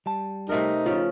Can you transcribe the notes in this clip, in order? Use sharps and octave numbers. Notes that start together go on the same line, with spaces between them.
G3 A5
C3 A3 D#4 A#4
C#3 F3 F4 C#5